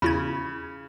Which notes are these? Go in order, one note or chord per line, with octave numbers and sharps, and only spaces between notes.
E2 C#3 E4 B5 G#6